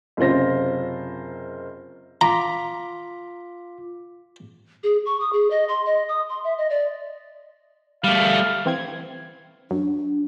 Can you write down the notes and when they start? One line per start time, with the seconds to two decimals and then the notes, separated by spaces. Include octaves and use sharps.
0.17 F#1 C3 F4 C5 A#6
2.21 F4 A#5 D6 B6
4.84 G#4
5.06 C#6
5.20 D#6
5.33 G#4
5.50 D#5
5.69 C6
5.86 D#5
6.09 D#6
6.29 C6
6.44 E5
6.58 D#5
6.70 D5
8.04 G3 A3 F5
8.66 E3 C4 G#6
9.71 F#2 D4